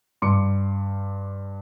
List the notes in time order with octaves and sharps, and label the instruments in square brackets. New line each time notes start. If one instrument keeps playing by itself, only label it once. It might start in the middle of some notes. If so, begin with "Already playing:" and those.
[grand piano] G2 C6 D6 C#7